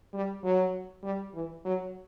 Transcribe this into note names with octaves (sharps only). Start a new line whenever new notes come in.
G3
F#3
G3
E3
F#3